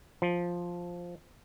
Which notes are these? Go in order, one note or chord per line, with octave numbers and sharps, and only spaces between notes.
F3